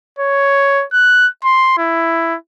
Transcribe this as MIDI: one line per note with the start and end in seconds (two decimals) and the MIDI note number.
0.19 0.84 73
0.93 1.28 90
1.44 1.75 84
1.78 2.36 64